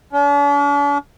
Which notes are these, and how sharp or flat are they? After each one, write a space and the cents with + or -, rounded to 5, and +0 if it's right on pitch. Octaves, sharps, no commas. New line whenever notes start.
D4 -45